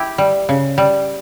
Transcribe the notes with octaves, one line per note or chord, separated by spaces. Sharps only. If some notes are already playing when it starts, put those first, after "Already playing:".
Already playing: E4 G4
G3
C#3
G3